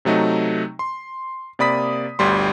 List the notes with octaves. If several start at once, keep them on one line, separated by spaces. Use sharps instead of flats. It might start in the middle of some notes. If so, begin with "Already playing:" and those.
C3 F#3 A3 D#4
C6
C3 A#3 D5 B5 D#6 B6
G1 D2 G3 C6